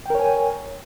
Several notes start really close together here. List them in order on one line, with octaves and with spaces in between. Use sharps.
G5 A#4 C#5 G#5